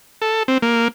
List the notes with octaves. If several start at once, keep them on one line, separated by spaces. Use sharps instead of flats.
A4
C4
A#3